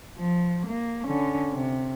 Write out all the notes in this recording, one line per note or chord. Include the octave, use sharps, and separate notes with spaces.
F3
A#3
D3 C#4
C3